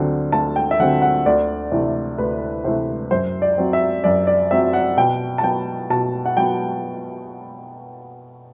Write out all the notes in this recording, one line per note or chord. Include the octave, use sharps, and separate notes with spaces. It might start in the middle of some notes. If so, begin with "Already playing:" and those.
Already playing: D2 D3 F#3 C4
D2 A5
G5
E5
D3 F#3 C4 F#5
F#5
D2 D5
C3 E3 A3
D2 B4
C3 E3 A3 C5
F#2 C5
D5
F#3 C4
E5
F#2 D5
D5
F#3 C4 E5
F#5
B2 G5
A5
F#3 B3 G5
B2 A5
F#5
F#3 B3 G5